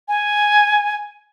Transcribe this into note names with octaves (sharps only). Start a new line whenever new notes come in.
G#5